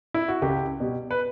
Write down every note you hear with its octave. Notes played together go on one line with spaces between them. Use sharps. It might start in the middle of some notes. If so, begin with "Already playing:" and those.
E4
F#4
C#2 G4
B2 G3
B4